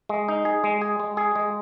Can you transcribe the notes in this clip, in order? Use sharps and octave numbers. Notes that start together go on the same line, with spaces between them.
G#3
D#4
G#4
G#3
G#4
G#3
G#4
G#3